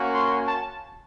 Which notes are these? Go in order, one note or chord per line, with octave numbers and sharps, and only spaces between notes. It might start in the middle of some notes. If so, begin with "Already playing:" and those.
Already playing: A#3 C#4 F#4
C6
A5